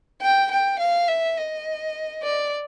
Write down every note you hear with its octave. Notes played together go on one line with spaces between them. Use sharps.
G5
G5
F5
E5
D#5
D5